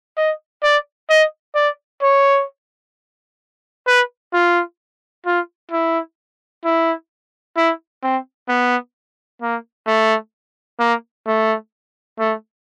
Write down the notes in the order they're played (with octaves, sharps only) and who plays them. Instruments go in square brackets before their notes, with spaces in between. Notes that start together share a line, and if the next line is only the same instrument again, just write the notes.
[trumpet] D#5
D5
D#5
D5
C#5
B4
F4
F4
E4
E4
E4
C4
B3
A#3
A3
A#3
A3
A3